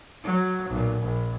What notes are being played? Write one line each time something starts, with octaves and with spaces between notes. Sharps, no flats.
F#3
B1 A#2
A#1